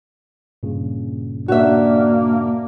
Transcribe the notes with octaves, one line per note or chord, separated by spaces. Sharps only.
G2 A#2 C#3
A#3 D4 F#4 E5